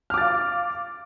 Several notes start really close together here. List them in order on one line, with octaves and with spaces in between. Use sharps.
F6 D6 A6 F5